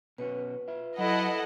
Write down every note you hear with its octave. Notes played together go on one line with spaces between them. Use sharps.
B2 C#4 F#4 B4
F4 E5
F#3 E4 A4 D#5 F#5